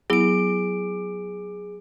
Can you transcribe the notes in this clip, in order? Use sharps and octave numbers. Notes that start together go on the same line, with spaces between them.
F#3 B3 E4 G#4 D7